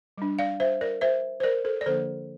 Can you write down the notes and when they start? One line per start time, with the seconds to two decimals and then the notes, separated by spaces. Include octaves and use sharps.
0.18 G3 D4
0.39 D5 F5
0.60 C5 E5
0.81 A#4 D5
1.01 C5 E5
1.40 C5
1.43 A#4 D5
1.65 A4 C5
1.81 D5
1.86 D3 F3 A#3 D4 A4 C5